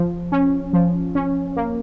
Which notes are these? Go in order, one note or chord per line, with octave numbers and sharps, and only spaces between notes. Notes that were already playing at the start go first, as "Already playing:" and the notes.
Already playing: F3
C#4
F3
C#4
A#3